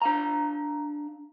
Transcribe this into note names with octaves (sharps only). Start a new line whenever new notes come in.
D4 F5 A#5